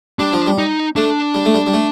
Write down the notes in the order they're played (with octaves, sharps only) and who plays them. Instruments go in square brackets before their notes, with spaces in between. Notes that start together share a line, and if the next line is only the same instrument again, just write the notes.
[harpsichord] G3 [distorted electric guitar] D4
[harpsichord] F3
G3
[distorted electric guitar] D#4
[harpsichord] A3 [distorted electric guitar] D4
[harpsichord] G3
A3
G3
G3
A3